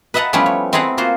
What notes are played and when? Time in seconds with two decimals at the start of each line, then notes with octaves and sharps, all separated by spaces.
0.14 B4 D#5 E5 F#5 A5 A#5
0.33 F3 G3 A3 B3 C#4 E4
0.46 C#5
0.73 C4 E4 G#4 F#5 A#5
0.98 A#3 F4 F#4 C5